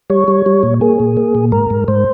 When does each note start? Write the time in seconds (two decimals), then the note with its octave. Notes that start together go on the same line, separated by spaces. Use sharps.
0.10 G3 C#5
0.28 G3
0.46 G3
0.63 A#2
0.81 A#3 G#4
1.00 A#2
1.17 A#3
1.35 A#2
1.52 G#2 A#4
1.70 G#2
1.88 G#2 C5